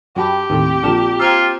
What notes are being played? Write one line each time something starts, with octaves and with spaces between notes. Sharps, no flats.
F#2 G4 G5 A5 B5
D#2 A2 C4
A#1 D3 A#3 F4 A5 E7
F4 C5 G5 A#5 E6 F6 G#6